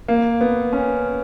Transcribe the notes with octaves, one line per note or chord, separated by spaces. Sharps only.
A#3
B3
C#4